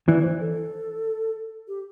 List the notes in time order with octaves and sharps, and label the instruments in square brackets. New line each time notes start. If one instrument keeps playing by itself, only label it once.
[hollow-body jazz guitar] E3 [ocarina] D5
[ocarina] D5
C5
A4
G4